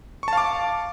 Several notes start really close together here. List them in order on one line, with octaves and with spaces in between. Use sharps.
C#6 A5 F5 D6